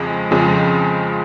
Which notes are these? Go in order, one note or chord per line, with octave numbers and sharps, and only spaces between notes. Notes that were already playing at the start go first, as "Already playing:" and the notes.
Already playing: F2 C#3 F3 G#3
F2 C#3 F3 G#3